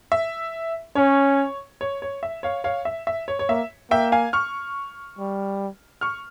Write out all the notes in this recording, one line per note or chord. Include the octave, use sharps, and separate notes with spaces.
E5
C#4 C#5
C#5
C#5
E5
C#5 F5
C#5 F5
E5
E5
C#5
C#5
A#3 E5
A#3 E5 G5
F5 G#5
C#6 F6
G3
C#6 F6